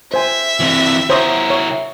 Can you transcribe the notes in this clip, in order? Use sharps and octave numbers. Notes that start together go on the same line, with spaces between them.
C5 E5 G#5
E3 C4
E4 A#4 C5 C#5 D#6
C#5